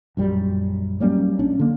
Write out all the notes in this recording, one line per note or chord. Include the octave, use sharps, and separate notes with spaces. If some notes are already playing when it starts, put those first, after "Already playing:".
A#1 F#2 G3
F#3 G3 A#3 C#4
A#1 C#4 D4
D3 A#3